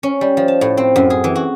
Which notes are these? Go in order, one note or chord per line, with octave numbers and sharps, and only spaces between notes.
C#4
G3
F3
A5
A2
C4
F#2
G#4
E3
F#4